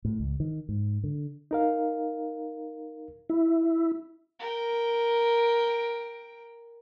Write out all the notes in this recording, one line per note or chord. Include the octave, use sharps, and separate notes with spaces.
A2
C#2
D#3
G#2
D3
D#4 A#4 F5
E4
A#4 G5